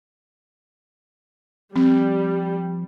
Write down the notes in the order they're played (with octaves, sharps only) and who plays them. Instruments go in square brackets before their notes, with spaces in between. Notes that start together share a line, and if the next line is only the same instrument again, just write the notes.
[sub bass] F3 [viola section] G3 [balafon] C4